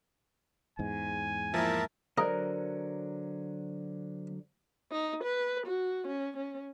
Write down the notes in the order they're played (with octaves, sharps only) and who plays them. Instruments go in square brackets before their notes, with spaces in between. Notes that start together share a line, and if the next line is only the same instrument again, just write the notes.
[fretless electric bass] E2 G#2 [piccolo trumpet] G#5
[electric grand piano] F3 A#3 E4 [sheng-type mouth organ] A#4 E5 A5
[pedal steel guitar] D3 F#3 F#6 [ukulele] A#4 [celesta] C5 D5 [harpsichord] D#5
[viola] D#4
B4
F#4
C#4
C#4